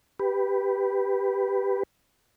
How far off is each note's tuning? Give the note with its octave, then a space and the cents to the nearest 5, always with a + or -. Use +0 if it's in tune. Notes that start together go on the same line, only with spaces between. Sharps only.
G4 +0 B4 +0